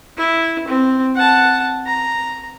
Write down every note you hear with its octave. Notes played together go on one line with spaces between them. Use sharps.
E4
C4
F#5 A5
A#5